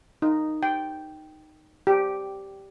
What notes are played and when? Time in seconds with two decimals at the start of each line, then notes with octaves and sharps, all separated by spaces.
0.22 D#4
0.63 G5
1.87 G4